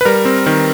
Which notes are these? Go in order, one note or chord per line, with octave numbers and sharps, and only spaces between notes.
B4
G3 A#4
C4
D#3